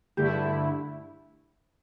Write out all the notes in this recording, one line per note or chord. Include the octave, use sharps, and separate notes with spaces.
G2 D3 A3 E4 G4